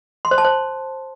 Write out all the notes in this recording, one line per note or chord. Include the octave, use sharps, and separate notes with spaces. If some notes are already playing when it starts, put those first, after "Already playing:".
C6
C5
A5
C5